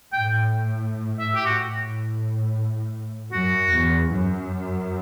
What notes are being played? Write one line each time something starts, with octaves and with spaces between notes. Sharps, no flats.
A2 G5
E5
G4
F#4
A2
F#2 F#4
E2
F#2